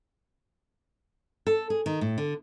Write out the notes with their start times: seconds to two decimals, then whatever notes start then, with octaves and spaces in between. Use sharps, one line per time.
1.47 A4
1.70 G#4
1.86 D#3
2.01 A2
2.18 D3